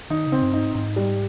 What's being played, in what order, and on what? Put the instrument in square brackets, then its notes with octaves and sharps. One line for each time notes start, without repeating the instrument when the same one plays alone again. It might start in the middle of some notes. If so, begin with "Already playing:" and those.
[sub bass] D#3 [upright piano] D#4
[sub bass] C#3
[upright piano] C4
[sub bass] G2
[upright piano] D#4
[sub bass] G#2
[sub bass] G#2 [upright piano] D#4
[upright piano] G3